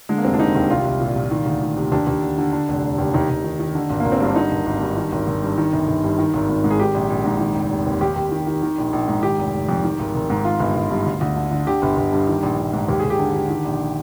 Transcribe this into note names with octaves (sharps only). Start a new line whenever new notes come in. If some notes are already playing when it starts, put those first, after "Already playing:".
D3 G#3
A#3
F1 C4
D4
F1 D#4
D#2
C2 F4
C2
A#2
A#2
D#3
D2
D2
C3
D#2 D4
D#2
D3
D3
D3
F1
F1
D#2
D#2 D#4
D#2
D#3
D#3
D3
G#1
G#1 A#3
C4
G2 D4
D3 D#4
G#1
G#1
G2
D#3
G#1
G#1
G2
D#3
G1
G1
G2
D#3
G#1
G#1
G#2
G#4
D#3 G4
A#1
A#1
G#2
D#3
F1
F1
D#2
D#2 G4
D#2
D#3
D#3
D#3
A#1
A#1
G#2
D#3 G4
F1
F1
F2
D#3
G#1
G#1
G#2
D#3 F4
G1
G1
G2
D2
D2
D3
D3
D3 G4
G1
G1
G2
D#3
A#1
A#1
G#2
D#2 G4
D#2 G#4
G4
D3
D3
D#3
A#1